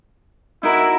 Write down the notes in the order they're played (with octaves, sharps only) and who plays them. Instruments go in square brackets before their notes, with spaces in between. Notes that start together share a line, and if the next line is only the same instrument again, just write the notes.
[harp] D#4 F#4 A#4 [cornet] E4